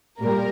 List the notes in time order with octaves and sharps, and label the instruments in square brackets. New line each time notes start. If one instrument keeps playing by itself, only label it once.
[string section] A#2 G3 A#4